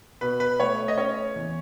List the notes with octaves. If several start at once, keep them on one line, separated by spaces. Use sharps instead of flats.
B2 B4
B4
A3 C#5
D#5
C#4 C#5
E2